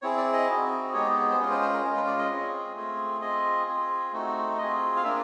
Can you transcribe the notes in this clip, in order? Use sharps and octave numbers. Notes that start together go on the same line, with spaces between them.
C4 E4 G#4 C#5
D5
D#5
C4 D#4 F#4
G#3 B3 D#4 G4 C#5
C5
G#3 C#4 F4 G#4 B4
C5
C5
A#4
G#3 C#4 F4 A#4
B4
D5
D#5
C4 F4 G#4
A3 C4 F4 G#4
C4 F4 G#4 D#5
C4 F4 G#4
A3 C4 D#4 F#4
C4 F4 G#4 D#5
F5
A#3 D4 F4 E5